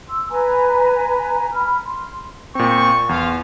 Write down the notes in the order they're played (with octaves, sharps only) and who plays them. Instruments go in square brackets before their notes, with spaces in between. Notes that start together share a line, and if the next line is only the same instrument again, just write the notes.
[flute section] C6 E6
B4 G#5 A#5
B5 F6
C6
[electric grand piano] A#2 C4 [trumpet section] C#6
[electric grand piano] E2 [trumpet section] F4 F5